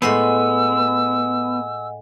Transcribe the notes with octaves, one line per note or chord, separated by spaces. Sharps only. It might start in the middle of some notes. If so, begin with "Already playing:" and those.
A2 G#3 B3 C5 D#5 F#5 G#5 E6